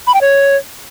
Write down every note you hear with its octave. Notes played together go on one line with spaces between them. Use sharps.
B5
G5
C#5